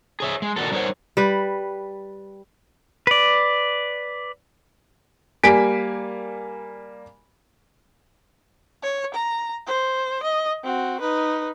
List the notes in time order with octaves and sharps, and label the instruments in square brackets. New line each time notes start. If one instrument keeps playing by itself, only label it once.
[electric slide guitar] G#4 C#5 E5
G#3
A#2 D#3 C4 D4 F#4 A4
G3 D#4 A#4 C5 C#5 F#5
[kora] G3 B4
[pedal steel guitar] B4 D5
[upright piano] G3 A#3 G#5 B6 D7
[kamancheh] C#5
A#5
C5
D#5
C4 F#4
D#4 B4